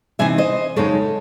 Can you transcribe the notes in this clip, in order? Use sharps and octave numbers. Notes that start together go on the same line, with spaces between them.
C3 E3 C4 D#4 E5 G#5
C5 D#5
F#2 C#3 G#3 D#4 A4 C#5